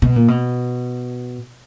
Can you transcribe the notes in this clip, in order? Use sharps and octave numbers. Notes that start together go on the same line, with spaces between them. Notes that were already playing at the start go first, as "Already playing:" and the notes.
B2
A#2
B2